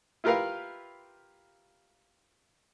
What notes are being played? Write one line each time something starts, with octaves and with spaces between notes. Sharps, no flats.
E4 F4 G4 A#4 B4 F5